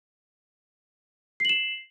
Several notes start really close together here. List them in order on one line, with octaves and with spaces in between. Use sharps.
C7 F#7 E7